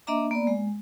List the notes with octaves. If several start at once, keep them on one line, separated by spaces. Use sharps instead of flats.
A#3 D4 D#5 E5 A#5 D6
A#3 B3 D5
G#3